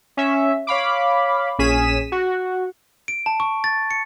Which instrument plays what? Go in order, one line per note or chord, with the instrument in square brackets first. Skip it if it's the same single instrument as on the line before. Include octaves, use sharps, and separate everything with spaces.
[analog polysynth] C#4 E5
C#5 F5 B5 D6
A#1 C#4 G#4 B6 D#7 E7
F#4
[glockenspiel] D7
A5
C#6
A6
C#7